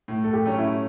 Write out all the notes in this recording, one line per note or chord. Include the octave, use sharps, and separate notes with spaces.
A2
A4
G4
F#3 A3 C#4
E4